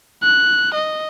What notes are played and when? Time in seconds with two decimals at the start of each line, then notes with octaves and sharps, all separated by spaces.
0.23 F#6
0.75 D#5